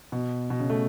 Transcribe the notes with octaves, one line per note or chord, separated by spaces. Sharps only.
B2
B2
C#3
A3